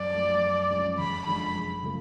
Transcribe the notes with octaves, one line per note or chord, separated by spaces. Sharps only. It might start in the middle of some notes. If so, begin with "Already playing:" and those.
Already playing: F#2 D5
F3 A3
F#2
F3 G#3 C#4
F1 B5
F2 F3 G#3 D4 B5
F#2
C#3 F3 A3